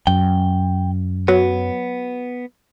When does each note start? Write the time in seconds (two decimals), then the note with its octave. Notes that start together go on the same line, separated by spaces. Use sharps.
0.07 F#2 G5
1.28 F#3 B3